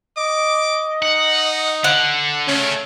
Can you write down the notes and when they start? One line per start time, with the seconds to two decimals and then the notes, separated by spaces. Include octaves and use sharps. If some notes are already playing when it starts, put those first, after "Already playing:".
0.17 D#5 D6
1.02 D#4 F#5
1.84 D3 F#5
2.48 C#3 A3 C#4